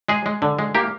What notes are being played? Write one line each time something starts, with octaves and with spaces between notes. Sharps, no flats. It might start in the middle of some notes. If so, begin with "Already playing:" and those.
G#3 G#4
G#3
D3
G#3
A#3 G4